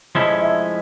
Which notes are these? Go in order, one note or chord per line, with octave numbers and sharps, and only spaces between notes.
F3 G#3 C#4 E4 A4 D#5
D#5
E5